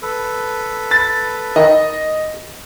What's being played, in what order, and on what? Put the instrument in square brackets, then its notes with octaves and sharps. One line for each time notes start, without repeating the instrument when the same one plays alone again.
[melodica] A4 B4
[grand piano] B5 A6
[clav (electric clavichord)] D#3 [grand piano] D#5